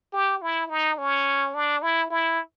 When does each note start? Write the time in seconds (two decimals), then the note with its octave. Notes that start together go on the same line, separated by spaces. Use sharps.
0.13 G4
0.42 E4
0.70 D#4
0.98 C#4
1.54 D4
1.82 E4
2.10 E4